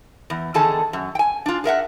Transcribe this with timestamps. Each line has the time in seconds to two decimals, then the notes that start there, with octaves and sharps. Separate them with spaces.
0.30 E2
0.54 E2 D3 D#3 G#4 A4 A5
0.93 F#2
1.15 G5 G#5
1.46 D4 F4
1.64 G#4 A#4 E5 F#5